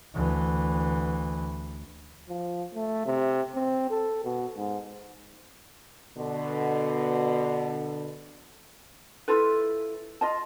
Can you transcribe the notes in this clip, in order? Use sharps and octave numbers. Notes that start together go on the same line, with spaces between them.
D2 E3
F3
A3
C3
C4
A4
B2
G#2
B2 D3
E4 F4 A4 B4
F4 D#5 A5